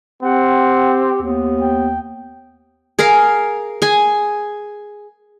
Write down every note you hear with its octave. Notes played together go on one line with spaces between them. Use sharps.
C4 G4 F#5
D#2 B3
G5
G#4 A#4 F5
G#4 G#5